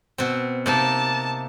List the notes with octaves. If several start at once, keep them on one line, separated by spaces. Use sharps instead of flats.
B2 C4
C3 A#3 D#4 A5